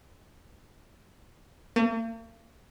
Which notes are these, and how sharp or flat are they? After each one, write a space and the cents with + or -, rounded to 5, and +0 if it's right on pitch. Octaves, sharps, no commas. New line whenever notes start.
A#3 -45